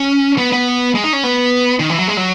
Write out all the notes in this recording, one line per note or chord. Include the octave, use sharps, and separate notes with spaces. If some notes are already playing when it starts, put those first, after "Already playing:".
Already playing: C#4
B3
B3
G#3
D#4
C#4
B3
D#3
E3
F#3
G#3
F#3